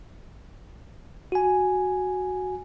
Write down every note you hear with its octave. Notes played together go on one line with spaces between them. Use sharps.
F#4 G#5